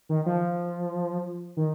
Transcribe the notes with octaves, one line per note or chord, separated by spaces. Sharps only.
D#3
F3
D#3